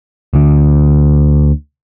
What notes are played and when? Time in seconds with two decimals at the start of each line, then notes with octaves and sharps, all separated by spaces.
0.34 D2 D3